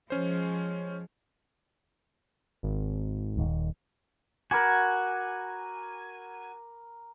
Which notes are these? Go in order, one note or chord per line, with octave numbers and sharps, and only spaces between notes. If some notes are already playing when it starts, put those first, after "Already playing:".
F3 G#3 C#4 C5
G#1
D#1 D#2
F#4 A#4 G#5 B5 D6